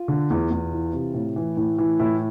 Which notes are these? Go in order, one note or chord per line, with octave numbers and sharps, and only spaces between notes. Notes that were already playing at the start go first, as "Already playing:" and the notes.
Already playing: F4
D3
E2
E2
E3
C3
A2
E3
A2
E3
A2 E4